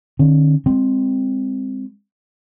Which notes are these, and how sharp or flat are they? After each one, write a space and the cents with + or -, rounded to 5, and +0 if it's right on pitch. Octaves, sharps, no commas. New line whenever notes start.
D#3 -45 C#4 -35
G#3 -35 C4 +0